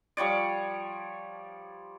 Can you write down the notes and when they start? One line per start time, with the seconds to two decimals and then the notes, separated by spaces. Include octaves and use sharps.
0.17 F3 G3 C#5 D5